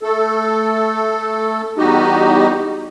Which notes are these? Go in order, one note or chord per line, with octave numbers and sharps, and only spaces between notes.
A3 A4
E2 G3 D#4 F#4 G4 D#5